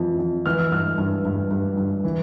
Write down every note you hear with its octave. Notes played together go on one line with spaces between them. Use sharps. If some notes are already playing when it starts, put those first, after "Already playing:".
Already playing: F2 E3
F2
E3 F6
E6
G2 F6
G2
G2
G2
G2
E3